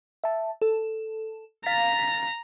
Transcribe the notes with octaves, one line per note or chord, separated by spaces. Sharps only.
E5 A5
A4
F5 A#5 A6 B6